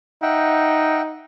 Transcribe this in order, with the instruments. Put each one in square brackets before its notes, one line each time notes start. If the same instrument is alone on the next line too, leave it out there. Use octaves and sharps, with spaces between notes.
[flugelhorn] D#4 [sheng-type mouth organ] E5 F#5 G5